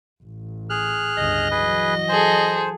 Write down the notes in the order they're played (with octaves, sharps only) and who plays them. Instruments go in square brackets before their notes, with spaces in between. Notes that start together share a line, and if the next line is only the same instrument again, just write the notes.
[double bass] A1
[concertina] G#4 F6 F#6
[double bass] G1 C#2 [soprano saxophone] D#5
[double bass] E3 F#3 [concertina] G#4 B4
[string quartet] G#4 A4 [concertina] C5